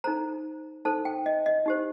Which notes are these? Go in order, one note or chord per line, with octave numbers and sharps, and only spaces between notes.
D#4 A4 C5 A#5
D#4 A4 C5 A5
G5
D#5
D#5
D#4 G4 C5